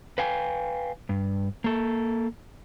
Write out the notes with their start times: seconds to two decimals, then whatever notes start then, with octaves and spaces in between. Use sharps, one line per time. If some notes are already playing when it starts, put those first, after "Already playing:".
0.18 B4 F5 G5 G#5
1.09 G2
1.64 A#3 A4